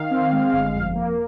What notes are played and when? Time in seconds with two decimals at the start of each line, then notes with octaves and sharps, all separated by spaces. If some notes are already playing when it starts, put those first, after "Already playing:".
Already playing: D#3 F5
0.11 C4
0.32 G#3
0.52 G1
0.74 F2
0.95 A#3